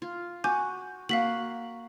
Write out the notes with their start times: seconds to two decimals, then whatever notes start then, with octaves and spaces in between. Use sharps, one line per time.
0.02 F4
0.44 F#4 G#5 D6 G6
1.09 A#3 F#4 F5 B6 F#7